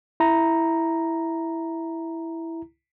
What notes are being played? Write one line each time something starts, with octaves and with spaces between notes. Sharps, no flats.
E4 A#5